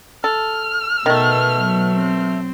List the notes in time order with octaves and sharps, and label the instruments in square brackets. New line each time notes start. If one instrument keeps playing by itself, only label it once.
[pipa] A4 [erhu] F6
[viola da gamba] B2 B3 [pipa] D#3 A3
[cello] F#3
[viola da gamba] C4